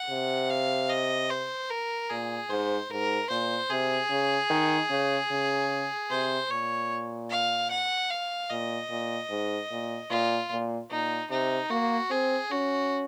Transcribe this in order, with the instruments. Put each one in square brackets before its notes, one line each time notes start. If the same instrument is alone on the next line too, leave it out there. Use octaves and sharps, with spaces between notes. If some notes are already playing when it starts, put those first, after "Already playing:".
Already playing: [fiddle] F#5
[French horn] C3
[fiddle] F5
D#5
C5
A#4
[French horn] A#2 [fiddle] G#4
[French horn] G#2 [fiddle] C5
[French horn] G#2 [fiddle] A#4
[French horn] A#2 [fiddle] C5
[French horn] C3 [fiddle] G#4
[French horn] C#3
D#3
C#3
C#3
[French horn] C3 [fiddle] C5
[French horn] A#2 [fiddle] C#5
[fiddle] F5
F#5
F5
[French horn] A#2 [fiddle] D#5
[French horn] A#2
G#2
A#2
[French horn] A#2 [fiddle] F4
[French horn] A#2
[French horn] A#2 [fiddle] D#4
[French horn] C3 [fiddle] D#4
[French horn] A#3 [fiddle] F#4
[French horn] C4 [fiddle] G#4
[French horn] C#4 [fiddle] F#4